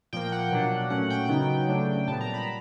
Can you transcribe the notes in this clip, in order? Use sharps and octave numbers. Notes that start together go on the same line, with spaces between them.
A#2 F3 A#3 G5
F#5
B2 F#3 A#3 D4
A#2 F#3 A3 C#4 F#5
G5
C#3 F#3 B3 D#4
C#3 F#3 A3 D4
A#2 G3 B3 A5
A#5
B5